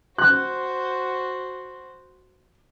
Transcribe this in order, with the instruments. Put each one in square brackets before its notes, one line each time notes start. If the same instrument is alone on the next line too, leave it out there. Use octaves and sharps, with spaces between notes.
[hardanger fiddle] F#4 C5 [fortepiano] F#6